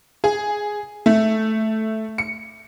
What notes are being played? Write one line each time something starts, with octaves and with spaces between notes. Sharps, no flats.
G#4
A3
C#7